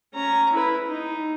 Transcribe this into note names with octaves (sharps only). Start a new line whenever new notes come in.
C#4 A#5
E4 B4
D#4